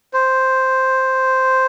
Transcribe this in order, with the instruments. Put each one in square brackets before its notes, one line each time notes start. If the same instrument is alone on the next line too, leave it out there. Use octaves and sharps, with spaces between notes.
[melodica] C5